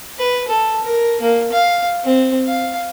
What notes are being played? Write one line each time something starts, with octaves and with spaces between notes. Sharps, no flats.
B4
A4
A#4
A#3
F5
C4
F5